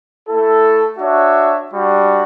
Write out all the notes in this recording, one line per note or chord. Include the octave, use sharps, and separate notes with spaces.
A3 E4 A4
D4 F#4 C#5 E5
G3 D4 F#4